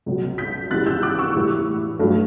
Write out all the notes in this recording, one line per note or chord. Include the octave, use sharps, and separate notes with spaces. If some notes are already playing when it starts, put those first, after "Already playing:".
C#2 B2 F#3
G6 B6
E2 C#3 E3 G3 F#6 A6
E6 G6
D6 F#6
C#6 E6
A2 E3 G3
G2 F#3 A3